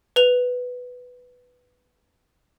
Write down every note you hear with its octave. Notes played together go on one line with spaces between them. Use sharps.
B4 F7